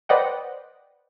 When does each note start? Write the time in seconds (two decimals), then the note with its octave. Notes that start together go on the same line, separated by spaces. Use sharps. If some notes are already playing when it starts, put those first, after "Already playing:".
0.09 B4 C5 D5 D#5 F#5 G5